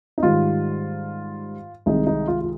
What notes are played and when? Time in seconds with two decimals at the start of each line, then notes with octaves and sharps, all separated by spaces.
0.18 D#4
0.23 G#2 D#3 G3 F4
1.86 C2 C3 D#3 G#3 D#4
2.07 D#4
2.27 F4
2.41 F4